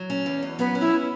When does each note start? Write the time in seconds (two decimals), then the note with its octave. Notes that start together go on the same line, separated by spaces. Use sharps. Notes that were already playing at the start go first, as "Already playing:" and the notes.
Already playing: F#3
0.10 C#4
0.26 E2
0.43 B2
0.59 F#3 B3
0.75 C#4
0.80 E4